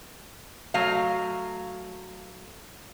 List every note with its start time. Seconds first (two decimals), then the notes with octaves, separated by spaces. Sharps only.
0.74 F#3 A3 F5